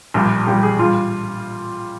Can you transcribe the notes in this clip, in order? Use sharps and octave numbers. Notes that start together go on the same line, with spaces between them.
A#1 A#2 G3
A#1 A#2 G3 G4
G#4
G3 F4